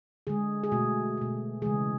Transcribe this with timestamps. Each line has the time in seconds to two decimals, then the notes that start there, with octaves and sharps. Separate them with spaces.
0.27 D3 G#3 G#4
0.64 G#4
0.72 B2 A3 F#4
1.18 B2 A3
1.62 C#3 E3 G#3 G#4